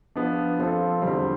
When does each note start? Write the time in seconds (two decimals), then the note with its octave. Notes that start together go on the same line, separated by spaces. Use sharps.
0.16 F3 B3 D4
0.59 F3 C4 F4 A4
1.02 E2 D3 G3 C4